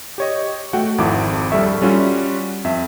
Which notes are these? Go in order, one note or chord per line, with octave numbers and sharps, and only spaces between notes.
G4 C#5 D#5
A3 F#4 F#5 G5
G#1 F2 E4 D6
A#1 G3 A4 E5 C#6
G3 C#4 F4 F#4
F2 E5